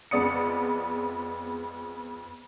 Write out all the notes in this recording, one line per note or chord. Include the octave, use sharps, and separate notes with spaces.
F2 G#3 B3 D5 D#6 C#7